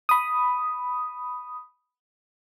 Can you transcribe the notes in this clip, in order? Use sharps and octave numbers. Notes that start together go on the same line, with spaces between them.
B5 D#6